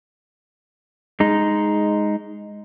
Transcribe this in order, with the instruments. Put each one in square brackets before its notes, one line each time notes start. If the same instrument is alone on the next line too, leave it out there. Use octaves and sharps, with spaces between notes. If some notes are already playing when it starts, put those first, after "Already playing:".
[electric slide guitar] G#3 D#4